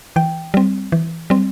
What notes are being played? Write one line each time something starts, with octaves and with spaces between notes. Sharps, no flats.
E3 G5
G3 C4
E3
G3 C4